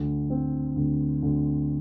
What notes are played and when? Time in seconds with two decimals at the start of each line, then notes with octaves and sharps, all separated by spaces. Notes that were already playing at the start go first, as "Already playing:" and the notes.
Already playing: D2
0.30 C4
0.76 D2
1.22 D2